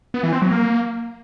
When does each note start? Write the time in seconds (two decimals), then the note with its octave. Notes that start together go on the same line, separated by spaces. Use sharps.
0.14 B3
0.23 E3
0.33 C4
0.42 F#3
0.51 A#3